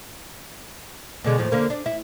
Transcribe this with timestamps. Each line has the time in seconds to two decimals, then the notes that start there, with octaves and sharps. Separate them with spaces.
1.24 B2 D3 G#3
1.38 D#2 A2 F3
1.52 D3 A#3
1.70 D4
1.86 E4